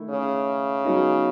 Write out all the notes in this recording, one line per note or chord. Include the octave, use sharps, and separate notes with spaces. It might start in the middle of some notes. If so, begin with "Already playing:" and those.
Already playing: D#3 A3 E4
C#3
F#3 B3 D#4 G#4